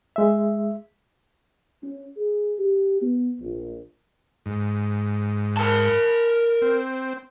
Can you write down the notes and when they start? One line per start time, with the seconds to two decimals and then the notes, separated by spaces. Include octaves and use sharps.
0.16 G#3 E5
1.83 C#4
2.17 G#4
2.59 G4
3.02 B3
3.41 A#1
4.46 G#2
5.57 A#4 A5
6.62 C4